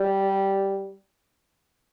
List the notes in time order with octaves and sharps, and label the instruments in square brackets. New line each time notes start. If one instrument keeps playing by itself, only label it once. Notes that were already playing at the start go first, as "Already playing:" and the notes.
Already playing: [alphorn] G3